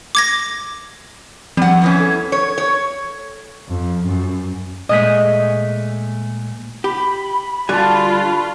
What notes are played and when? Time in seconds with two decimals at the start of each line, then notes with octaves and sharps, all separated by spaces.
0.15 D6 G#6 A#6
1.57 F3 G3 C4 F#5
1.82 E2 E3 C#4
2.00 A4 G#6
2.32 C#5
2.58 C#5
3.68 F2
4.05 F#2
4.89 A#2 G#3 A3 D#5 B6
6.84 G4 B5
7.69 D3 G3 F4 F#4 G#5 A5 B5